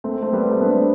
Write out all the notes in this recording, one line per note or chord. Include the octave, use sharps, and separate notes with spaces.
A3 C4
A3 C4
G3 B3
A3 C4
B3 D4
A3 C4